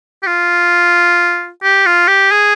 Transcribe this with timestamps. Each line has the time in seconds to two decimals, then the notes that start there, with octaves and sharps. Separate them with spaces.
0.23 G4
0.27 F4
1.63 G4
1.86 F4
2.08 G4
2.31 G#4